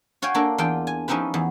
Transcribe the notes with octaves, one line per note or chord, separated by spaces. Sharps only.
F#4 C#5 F5 G5 G#5
A#3 D4 A4
E2 D4 F4 G5
G#5
F3 C#4 D#4 E4 G4 B4
E2